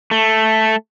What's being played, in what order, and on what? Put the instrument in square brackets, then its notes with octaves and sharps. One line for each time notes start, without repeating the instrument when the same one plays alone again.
[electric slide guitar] A3